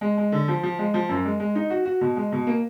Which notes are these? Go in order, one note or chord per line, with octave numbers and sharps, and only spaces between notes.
G#3
G#3
D3
F3
F3
G#3
F3
F#2
G#3
G#3
D#4
F#4
F#4
B2
G#3
B2
A#3